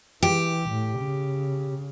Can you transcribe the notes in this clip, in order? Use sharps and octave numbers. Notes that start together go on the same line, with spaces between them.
E3 G4
A2
C#3